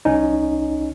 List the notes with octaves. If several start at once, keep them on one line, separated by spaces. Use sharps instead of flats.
C2 C#4 D#4